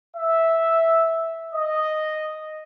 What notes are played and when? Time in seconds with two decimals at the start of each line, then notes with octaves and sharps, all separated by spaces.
0.16 E5
1.53 D#5